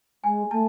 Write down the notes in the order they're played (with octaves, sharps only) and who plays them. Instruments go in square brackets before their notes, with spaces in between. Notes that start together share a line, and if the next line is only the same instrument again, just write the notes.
[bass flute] G#3 [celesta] G#5
[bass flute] A3 [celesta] A5